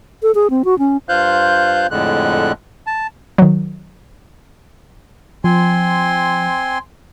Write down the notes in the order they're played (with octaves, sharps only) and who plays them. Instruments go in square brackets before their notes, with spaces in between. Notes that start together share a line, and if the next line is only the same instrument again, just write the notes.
[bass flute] A4
G#4
C4
F#4
C#4
[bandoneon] G2 F4 C5 F5 F#6 G6
F2 A2 D3 G#3 F#6
A5
[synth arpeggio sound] D#3 F#3
[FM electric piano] F3 [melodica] C4 G#5 C6